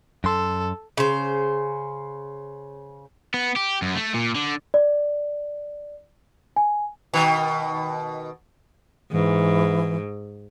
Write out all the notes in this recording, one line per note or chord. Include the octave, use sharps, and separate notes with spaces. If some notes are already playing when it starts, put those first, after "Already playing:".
F#2 A4 C6
C#3 C5
B3
G4
F#2
A3
A#2
D3
D5
G#5
B2 D#3
G#2 E3